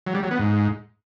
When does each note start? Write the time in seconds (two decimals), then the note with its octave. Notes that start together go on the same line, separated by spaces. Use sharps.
0.07 F#3
0.15 G3
0.23 F#3
0.31 B3
0.39 G#2